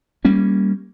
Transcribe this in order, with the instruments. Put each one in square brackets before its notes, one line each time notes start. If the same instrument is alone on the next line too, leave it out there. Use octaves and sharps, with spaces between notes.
[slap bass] G3 A#3 C#4